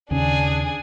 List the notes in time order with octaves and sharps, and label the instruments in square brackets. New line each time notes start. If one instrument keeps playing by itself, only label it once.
[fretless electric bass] D#2 C#3 [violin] D4 G#4